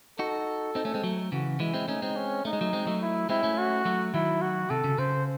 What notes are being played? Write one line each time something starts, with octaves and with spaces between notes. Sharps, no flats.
D#4 F#4 A4
C4 D#4
A3 C#4
G#3 C4
F#3 A3
C#3 E3 F#4
E3 G#3 E4
G#3 C4
A3 C#4 D#4
G#3 C4
C#4
A3 D#4
G#3
F#3 A3
G#3 C4
F#3 A3
E4
G#3 C4 E4
A3 C#4
F#4
F#3 A3
D#3 F#3 E4
F#4
C3 A4
C#3
C#3 C5